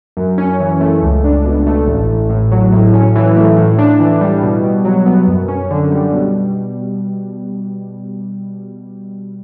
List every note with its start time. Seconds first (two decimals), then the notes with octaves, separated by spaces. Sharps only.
0.17 F#2
0.38 C#4
0.60 E3
0.81 A3
1.03 C#2
1.24 D4
1.45 B2
1.67 A3
1.88 A1
2.09 A1
2.29 A2
2.52 F#3
2.72 A2
2.94 C#4
3.16 E3
3.37 A3
3.57 A2
3.78 D4
4.00 E3
4.21 G3
4.42 B2
4.63 B2
4.85 F#3
5.06 B3
5.27 F#2
5.48 C#4
5.70 D3
5.91 G3
6.12 B2